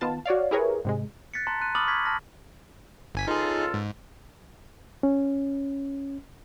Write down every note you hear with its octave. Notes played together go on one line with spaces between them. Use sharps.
D#3 B3 F4 A5
F#4 C#5 D5 F5
E4 G4 G#4 A#4 B4 C#5
G#2 C3 G#3
F#6 A6 B6 C#7
A5 A#5 C6 F#6
C6 F#6 D#7
B5 D6 D#6 F6 A6 F#7
C#6 F6 G#6 B6
A5 F6 A#6
G1 G#5 B6
C#2 D#4 F4 G#4 A4
G#2
C#4